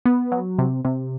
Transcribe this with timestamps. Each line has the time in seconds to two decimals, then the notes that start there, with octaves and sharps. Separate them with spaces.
0.05 B3
0.32 F#3
0.59 C3
0.85 C3